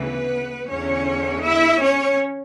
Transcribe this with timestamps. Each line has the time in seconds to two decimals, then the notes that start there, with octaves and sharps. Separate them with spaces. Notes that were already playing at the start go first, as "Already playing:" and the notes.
Already playing: D2 C#3 E3 B3 B4
0.69 E2 D3 C#4 C#5
1.43 E4 E5
1.81 C#4 C#5